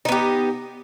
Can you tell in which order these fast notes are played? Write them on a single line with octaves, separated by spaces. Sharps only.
D#4 B3 G4